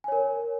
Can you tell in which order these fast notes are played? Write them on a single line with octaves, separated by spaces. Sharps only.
G#5 C#5 A#4